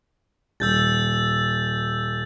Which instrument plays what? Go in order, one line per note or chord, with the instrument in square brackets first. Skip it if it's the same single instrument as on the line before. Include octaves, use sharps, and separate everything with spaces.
[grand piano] D#1 [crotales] E6 G6 A6